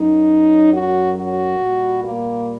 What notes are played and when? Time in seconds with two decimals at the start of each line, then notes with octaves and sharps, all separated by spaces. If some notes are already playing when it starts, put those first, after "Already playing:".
Already playing: F#2 F#3 D#4
0.71 F#4
1.14 F#4
1.58 A#2 G3
2.01 A#3